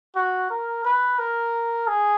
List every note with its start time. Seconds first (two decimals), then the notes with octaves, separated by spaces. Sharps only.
0.16 F#4
0.50 A#4
0.84 B4
1.19 A#4
1.87 G#4